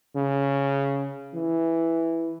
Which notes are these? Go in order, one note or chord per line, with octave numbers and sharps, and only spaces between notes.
C#3
E3